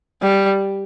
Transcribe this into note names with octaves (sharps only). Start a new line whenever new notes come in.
G3